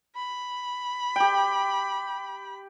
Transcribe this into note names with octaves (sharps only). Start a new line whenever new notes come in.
B5
G4 G5